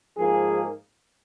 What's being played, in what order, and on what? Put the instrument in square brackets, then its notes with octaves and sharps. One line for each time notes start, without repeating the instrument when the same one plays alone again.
[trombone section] G#2 F3 A#3 G#4